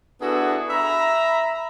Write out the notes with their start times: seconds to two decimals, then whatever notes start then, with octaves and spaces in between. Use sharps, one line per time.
0.22 B3 D4 E4 F#4 G#4 A4
0.70 E5 A#5 B5